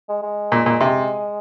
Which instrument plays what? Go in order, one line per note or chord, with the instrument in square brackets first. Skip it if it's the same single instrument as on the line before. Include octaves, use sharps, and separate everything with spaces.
[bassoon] G#3
G#3
[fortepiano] A#2
A#2
C3